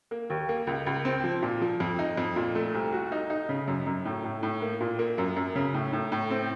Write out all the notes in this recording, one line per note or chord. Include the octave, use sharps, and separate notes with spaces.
A#3
D#2
A#3
C#2
C#2
C4
F3
A#2
F3
F2
D#4
F2
A#2
A3
C2
F#4
D#4
D#4
C#3
F#2
F#2
A2
A2
A2
A#3
A#2
A#3
F#2
F#2
C#3
A2
A2
A2
C4